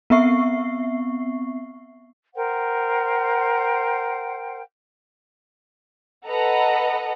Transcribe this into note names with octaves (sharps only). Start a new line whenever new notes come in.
B3 C4 E5 C#6 C7
A#4 C5 F#5 G5
A4 B4 D#5 F#5 A#5